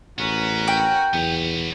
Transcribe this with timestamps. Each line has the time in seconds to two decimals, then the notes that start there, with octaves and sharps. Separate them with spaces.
0.19 A1 B3 C#4 F#4 A#4
0.68 G5
1.14 E2 B3 C#5